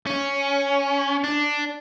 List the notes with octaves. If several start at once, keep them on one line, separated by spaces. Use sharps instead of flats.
C#4
D4